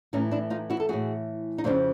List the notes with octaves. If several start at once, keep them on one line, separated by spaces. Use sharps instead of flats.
A2 E3 C#4 D#4
D4 E4
D#4 F4
E4 F#4
A4
A2 E3 F#4 G#4
D#4
F2 C#3 F3 C4 D4